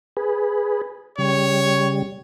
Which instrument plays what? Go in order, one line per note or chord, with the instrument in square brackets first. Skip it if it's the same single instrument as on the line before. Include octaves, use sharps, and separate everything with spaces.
[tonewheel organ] G#4 B4
[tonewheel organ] C#3 G3 [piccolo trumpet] C#5